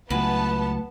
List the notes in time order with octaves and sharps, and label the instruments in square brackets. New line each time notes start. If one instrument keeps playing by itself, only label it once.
[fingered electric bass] C#2 F#3 [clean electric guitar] A2 [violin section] B3 A5 [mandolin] B4 G#5